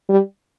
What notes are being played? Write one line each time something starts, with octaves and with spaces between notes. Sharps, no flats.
G3